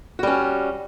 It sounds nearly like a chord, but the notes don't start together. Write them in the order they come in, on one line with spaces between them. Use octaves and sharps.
F#4 G3 C#4